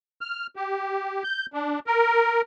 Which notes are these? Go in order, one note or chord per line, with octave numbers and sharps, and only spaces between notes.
F6
G4
G6
D4
A#4